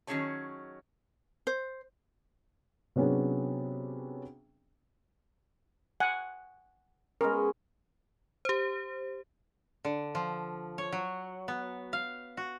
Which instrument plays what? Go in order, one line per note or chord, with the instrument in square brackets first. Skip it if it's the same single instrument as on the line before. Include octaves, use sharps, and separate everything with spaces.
[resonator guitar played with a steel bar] D#3 F#3 C#4 G#4 C#5 A5
[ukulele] C5
[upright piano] C3 F#3 B3 C#4 D4 G#4
[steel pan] F#5 G#5
[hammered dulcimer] G#3 B3 C#4 [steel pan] A#4
[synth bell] G4 C5
[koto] D3
F3
C#5
F#3
B3
F5
F#4